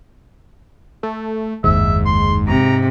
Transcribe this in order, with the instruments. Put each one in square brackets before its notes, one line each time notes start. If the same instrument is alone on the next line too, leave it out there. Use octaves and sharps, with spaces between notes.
[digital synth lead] A3
[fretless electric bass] F#1 D#2 [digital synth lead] G#2 [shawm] E5
[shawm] C6
[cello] C3 [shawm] A#5